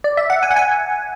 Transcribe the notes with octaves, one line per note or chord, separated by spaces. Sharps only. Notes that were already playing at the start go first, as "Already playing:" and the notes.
D5
E5
F#5
G#5
F#5
G#5